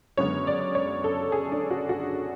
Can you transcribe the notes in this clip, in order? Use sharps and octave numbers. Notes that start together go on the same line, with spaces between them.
F#2 D3 G#3 B3 C#5
D5
C#5
A4
G#4
D4
F#4
F#4